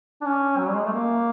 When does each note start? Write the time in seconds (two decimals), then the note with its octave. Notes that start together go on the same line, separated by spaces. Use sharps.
0.21 D4
0.26 C#4
0.58 F#3
0.67 G3
0.75 G#3
0.84 A3
0.93 A#3